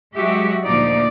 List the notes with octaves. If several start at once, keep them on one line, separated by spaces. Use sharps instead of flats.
F#3 G#3 F#4 G4 E5
D2 A#2 F3 A#3 D#4 D5